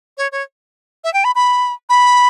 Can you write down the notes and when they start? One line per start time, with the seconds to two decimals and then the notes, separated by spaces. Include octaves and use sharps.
0.18 C#5
0.32 C#5
1.04 E5
1.14 G5
1.24 B5
1.35 B5
1.89 B5